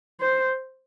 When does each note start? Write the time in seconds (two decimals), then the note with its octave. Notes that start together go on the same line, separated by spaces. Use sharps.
0.21 C5